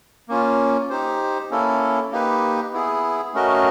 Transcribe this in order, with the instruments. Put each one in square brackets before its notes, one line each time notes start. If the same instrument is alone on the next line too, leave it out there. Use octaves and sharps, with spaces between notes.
[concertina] A#3 C#4 F4
D#4 G4 C5
A#3 C#4 E4 A4
A#3 D#4 G4 B4
B3 E4 G#4
A3 C#4 F#4 A#4 D#5